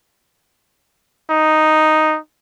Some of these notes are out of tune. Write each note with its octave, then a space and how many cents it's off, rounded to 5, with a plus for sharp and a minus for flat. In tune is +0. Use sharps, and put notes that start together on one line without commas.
D#4 +0